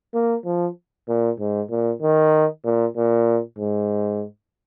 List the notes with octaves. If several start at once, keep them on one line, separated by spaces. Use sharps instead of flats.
A#3
F3
A#2
G#2
A#2
D#3
A#2
A#2
G#2